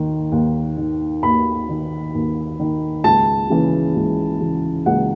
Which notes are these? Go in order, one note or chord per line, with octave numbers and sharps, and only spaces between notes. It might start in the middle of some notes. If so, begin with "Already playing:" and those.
Already playing: D#2 D#3
D#2
D#3
D#2 B5
D#3
D#2
D#3
C#2 A5
C#3 E3
C#2
C#3 E3
C#2 F#5